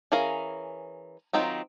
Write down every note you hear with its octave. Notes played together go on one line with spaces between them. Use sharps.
E3 C#4 G#4 A#4 F5
D#3 F#3 C4 D#4 F4